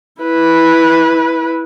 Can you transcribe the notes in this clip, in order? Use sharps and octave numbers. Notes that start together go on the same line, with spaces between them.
E4 B4